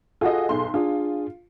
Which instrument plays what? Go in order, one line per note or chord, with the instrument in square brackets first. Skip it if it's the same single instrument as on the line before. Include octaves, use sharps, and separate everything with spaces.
[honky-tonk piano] F4 F#4 D#5 [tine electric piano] G#4 A4 G#5
[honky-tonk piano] B1 C6
[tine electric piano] D4 G#4 [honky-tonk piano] F4